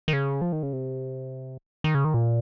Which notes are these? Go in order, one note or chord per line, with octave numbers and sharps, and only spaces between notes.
D#3
C#3
F3
D#3
C#3
C3
D#3
C#3
D#3
A#2